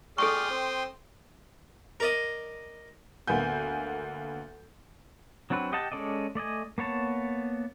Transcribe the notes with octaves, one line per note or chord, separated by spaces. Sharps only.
G#4 A4 D5 G5 C6 C#6 D#6 F6
C4
A#4 D5 D#5
D2 A#3 B3 G#5 G6
F#3 C4 D4 F#4 B4
G4 D#5 F#5 G5 A5
G#3 C#4 A4 D5 D#5
A3 D5 D#5 G#5
A#3 B3 C#5 A5